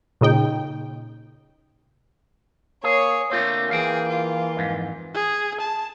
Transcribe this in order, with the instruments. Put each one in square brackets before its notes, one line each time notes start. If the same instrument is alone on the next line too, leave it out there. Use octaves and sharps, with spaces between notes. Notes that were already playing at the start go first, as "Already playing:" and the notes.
[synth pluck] A#2 C#3 D#4 G5
[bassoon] A#3 [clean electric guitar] G#4 [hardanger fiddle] C#5
[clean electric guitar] D3 A3 C4 [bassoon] A#3 [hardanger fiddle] F4
[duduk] E3 [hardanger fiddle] G#4 [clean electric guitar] F5 G5
[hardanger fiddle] F4
[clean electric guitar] F2 G#2
[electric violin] G#4
A5